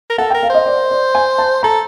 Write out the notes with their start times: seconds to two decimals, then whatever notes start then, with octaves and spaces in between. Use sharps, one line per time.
0.10 A#4
0.18 A4 F#5
0.30 G5
0.34 A#4
0.43 F5
0.50 C5 D#5
0.66 D5
0.91 D5
1.15 G#5
1.38 A5
1.63 A4 A#5